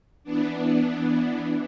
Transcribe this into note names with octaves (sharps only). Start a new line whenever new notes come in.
E3 B3 D4
E3